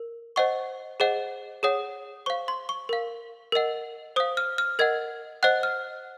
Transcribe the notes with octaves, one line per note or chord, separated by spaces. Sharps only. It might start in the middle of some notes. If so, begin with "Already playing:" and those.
Already playing: A#4
C5 D#5 F#5 C#6
G#4 C5 D#5 F#5
G#4 C#5 F#5 D#6
C5 F5 C#6
C6
C#6
A#4 F5
A#4 D#5 F#5
C5 F5 D#6
F6
F6
A#4 D#5 F#5 G#6
C5 D#5 F#5 F#6
F6